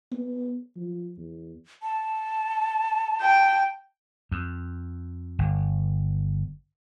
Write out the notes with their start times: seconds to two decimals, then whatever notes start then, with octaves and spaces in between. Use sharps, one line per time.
0.12 B3
0.77 F3
1.17 E2
1.83 A5
3.22 G5
4.32 F2
5.39 G1